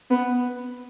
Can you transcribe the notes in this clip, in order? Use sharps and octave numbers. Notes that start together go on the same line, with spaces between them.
B3